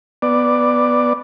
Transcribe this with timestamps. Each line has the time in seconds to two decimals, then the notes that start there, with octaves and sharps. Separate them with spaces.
0.22 B3 D5